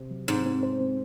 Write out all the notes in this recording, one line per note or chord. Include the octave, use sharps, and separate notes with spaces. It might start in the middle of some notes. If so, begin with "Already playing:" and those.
Already playing: C3
F#3
G#2 C4
C4
C5
C4